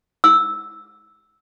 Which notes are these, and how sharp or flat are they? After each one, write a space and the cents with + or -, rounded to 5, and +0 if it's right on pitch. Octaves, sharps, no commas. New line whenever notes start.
E6 -5